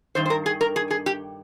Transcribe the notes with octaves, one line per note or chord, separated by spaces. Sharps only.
G2 D#3 C5
C5
A#4
G#4
A#4
G#4
G#4
G4